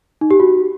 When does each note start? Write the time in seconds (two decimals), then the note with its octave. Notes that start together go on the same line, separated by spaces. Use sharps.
0.21 D#4
0.31 G4
0.40 F#4